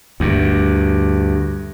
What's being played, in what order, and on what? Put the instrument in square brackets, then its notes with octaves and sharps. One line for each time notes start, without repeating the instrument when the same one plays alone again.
[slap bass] D2 G2